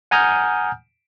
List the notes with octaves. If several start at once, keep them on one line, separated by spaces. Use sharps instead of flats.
F#5 G#5 A#5 D#6 F6 G6